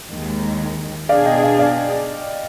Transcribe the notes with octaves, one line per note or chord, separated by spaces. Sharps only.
D#2 D#3 G#3
B2 B3 D4 G#4 D5 F5
D#5 G5
D5 F5
D5 F5